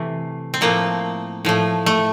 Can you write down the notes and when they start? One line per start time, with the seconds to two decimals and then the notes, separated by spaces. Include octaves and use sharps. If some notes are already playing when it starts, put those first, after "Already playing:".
Already playing: C3 E3 A3
0.54 C4
0.61 A2 F3 A3 A#3
1.45 A2 F3 A3
1.86 A3